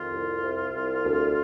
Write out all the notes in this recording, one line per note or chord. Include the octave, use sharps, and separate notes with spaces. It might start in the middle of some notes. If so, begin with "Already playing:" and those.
Already playing: F2 D#3 F4
C2
C3
C2
D2